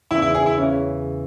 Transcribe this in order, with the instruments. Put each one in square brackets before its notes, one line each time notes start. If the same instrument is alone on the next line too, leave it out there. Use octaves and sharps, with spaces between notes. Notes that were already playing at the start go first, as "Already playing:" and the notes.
[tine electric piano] E2 C#3 E3 [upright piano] E4
[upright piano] E4
G#4
E4
[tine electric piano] C#3 E3 [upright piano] C#4